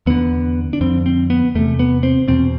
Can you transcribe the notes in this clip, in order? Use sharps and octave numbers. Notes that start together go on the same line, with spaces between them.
E2 D3 B3
D4
F2 D3 C4
C4
B3
E2 C3 A3
B3
C4
E2 B2 C4